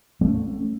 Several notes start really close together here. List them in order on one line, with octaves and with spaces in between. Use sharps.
G#3 A3 C#4